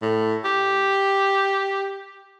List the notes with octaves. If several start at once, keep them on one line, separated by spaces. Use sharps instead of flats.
A2
G4